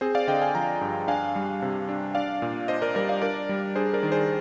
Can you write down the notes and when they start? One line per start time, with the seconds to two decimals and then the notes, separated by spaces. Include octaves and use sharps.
0.01 C4 G#4 C5
0.15 D5 F5
0.27 D3 D#5 G5
0.41 F5 G#5
0.55 F3 G5 A#5
0.81 G2
1.08 D4 F5 G#5
1.36 G3
1.62 C3
1.89 D4
2.15 D4 D5 F5
2.42 A#2
2.68 D4 C5 D#5
2.82 A#4 D5
2.95 G3 A#4 D5
3.09 D5 F5
3.22 D4 A#4 D5
3.49 G3
3.75 D4 G#4 C5
3.94 A#4 D5
4.03 D#3
4.12 G#4 C5